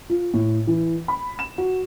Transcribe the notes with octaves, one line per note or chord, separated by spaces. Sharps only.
F4
A2
E3
B5
E7
F#4